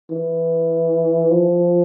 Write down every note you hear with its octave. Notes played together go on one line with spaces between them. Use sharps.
E3
F3